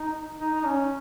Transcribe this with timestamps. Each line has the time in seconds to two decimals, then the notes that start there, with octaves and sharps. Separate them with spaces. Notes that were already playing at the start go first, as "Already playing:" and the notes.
Already playing: D#4
0.40 D#4
0.55 D#4
0.67 C#4